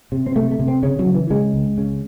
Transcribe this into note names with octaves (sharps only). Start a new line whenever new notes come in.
C3
C4
C3 A3
A3
C3
C4
C#3 C#4
F#3
C#3
E3
C#3 G#3
C#2
C#3